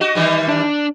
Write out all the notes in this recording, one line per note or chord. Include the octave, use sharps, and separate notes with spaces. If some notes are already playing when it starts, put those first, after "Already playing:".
F#4 D#5
D#3 E3 G3
D4